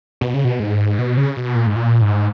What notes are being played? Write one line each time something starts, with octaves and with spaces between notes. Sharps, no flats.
B2
C#3
B2
G#2
B2
C#3
B2
A#2
G#2
A#2
G#2